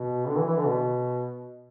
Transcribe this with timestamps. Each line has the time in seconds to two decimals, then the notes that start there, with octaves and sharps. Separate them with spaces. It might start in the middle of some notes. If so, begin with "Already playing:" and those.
Already playing: B2
0.27 D3
0.37 E3
0.47 E3
0.56 D3
0.65 B2